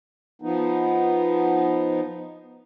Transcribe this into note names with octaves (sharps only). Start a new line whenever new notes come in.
F3 B3 D#4